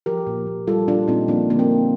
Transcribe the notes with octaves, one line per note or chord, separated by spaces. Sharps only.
F3 G4 A#4
A#2
A#2
G3 F4 A4
A#2 D4 F4
A#2 C4 D#4
F3 A#3 D4
D3 A#3
C4
D3